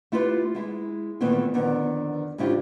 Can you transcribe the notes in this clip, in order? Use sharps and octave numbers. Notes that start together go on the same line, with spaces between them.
A3 E4 F4 G4 B4
G#3 E4
A#2 D#3 E3 A3 B3 C4
F2 D3 D#3 B3
G#2 C#3 D4 E4 F4 G4